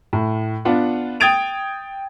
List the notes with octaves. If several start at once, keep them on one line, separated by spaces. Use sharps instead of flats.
A2
B3 D4 F4 F#5
G5 D#6 G#6 A6 D7 F7